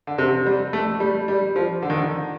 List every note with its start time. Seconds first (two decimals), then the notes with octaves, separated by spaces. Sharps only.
0.07 D3
0.18 C3
0.46 G3
0.73 A3
1.00 G3
1.28 G3
1.56 F3
1.82 D3
1.90 D#3
1.98 D3